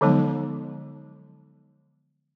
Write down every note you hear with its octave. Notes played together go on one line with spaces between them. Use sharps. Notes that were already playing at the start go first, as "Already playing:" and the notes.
D3 F3 F#3 G#3 B3 D#4